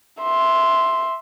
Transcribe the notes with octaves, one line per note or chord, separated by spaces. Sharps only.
E5 C6